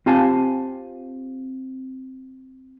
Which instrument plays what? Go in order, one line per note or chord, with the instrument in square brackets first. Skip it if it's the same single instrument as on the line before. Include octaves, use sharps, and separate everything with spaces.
[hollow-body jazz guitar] C4 F4 G4 F5 G#5 A5